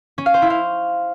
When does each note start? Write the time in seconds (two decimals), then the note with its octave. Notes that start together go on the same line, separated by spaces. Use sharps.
0.18 C#4
0.26 F5
0.34 C5
0.42 E4
0.50 F5